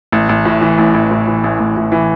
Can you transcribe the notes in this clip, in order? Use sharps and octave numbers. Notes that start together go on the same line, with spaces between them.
A1
A1
A2
E3
A1
A1
A2
E3
A1
A1
A2
E3